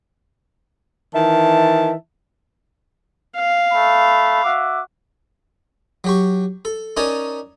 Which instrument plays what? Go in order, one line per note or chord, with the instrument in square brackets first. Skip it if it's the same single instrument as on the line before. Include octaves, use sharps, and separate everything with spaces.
[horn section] D#3 E3 E5 A5
[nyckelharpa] F5
[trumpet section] A3 B5
F#4 E5 D6
[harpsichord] F#3 G4 C#6
A4
C#4 D#4 A#4 D5 G#5 A5